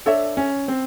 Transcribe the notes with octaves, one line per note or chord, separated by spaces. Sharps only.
D4 A4 C#5 E5
C#4
C4